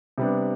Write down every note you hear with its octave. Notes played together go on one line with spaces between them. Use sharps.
C3 G3 B3 D4